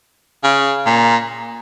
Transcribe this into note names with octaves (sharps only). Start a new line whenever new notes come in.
C#3
A#2